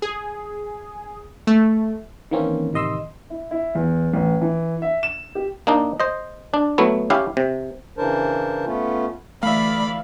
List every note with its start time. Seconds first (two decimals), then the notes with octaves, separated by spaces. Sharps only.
0.02 G#4
1.47 A3
2.31 D#3 E3 A#3 C4 C#4
2.73 A1 C3 D#3 D#5 C6 E6
3.30 E4
3.51 E4
3.75 E2
4.13 A1
4.41 E3
4.82 E5
5.03 E7
5.35 G4
5.67 A#3 D4 D#4
6.00 C5 D#5
6.54 D4
6.78 F#3 A3 B3 E4
7.10 C#4 E4 G4 F5
7.37 C3
7.98 C#3 E3 D4 A#4 C5 A5
8.66 A3 B3 C#4 F4
9.43 D2 E3 A3 D5 E5 F5 B5